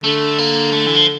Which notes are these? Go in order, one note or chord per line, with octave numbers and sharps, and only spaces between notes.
D3 A3
A#3
A3
E3
F3